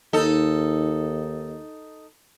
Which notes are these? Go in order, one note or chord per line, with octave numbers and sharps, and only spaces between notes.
D#2 D#4 A4